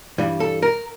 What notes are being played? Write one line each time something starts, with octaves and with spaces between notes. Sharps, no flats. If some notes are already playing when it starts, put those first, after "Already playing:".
G2 E3 G3
A4
A#4